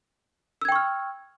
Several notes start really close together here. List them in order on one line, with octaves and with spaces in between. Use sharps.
E6 G#6 G5 C#6 F6